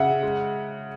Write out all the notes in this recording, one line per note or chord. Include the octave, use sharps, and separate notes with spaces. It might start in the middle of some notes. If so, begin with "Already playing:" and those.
Already playing: C#3 E5 F#5
G#3